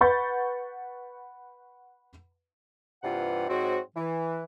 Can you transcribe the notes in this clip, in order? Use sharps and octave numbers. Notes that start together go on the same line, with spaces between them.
B4 F#5 B5 C#6 G6 A6
G2 C3 E3 F4 F#5
G#2 F#3 C4 F#4
E3